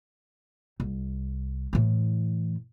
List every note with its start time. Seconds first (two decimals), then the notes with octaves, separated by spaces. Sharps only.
0.80 C2
1.73 A2 E3